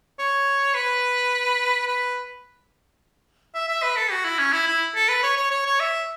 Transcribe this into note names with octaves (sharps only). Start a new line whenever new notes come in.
C#5
B4
B4
E5
E5
B4
A4
F#4
E4
C#4
E4
E4
A4
B4
C#5
C#5
C#5
C#5
E5